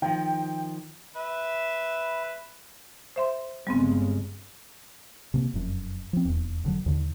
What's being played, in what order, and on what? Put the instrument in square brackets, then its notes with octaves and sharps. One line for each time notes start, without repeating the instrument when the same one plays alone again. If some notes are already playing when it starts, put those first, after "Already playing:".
[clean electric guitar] D#3 F3 [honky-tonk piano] G5
[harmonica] B4 E5
[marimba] C5 E5 C6
[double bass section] G1 C#3 G#3 [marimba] G3 B3 C4
[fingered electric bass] C3 A3 A#3
F1 F#2
F3 C4
D#1 E2
F1 D3 F#3
D#2 D3